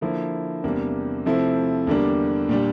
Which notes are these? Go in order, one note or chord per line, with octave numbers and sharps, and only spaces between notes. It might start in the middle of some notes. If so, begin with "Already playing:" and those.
D3 F3 A#3 E4
E2 C3 G3 A#3 D4
C3 F3 A3 C4 E4
E2 D3 G3 A#3 D4
A#2 G3 D4